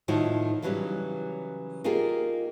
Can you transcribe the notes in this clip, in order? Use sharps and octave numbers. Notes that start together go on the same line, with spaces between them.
A2 D#3 F3 D#4 E4 F#4
C#3 E3 F#3 G3 C#4
A#3 D#4 F4 G4 G#4 A#4